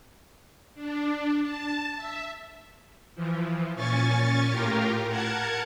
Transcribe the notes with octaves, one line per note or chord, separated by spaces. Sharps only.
D4
A5
E5
E3 F3
A#2 C#4 G#5 C#6 A6
A2 F4 G4 A#4
A#4 F#5 A5 G#6